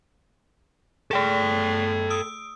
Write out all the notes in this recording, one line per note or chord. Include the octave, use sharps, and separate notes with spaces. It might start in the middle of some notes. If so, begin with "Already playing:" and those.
A3 G#4 A4 G5
D#6 E6 D7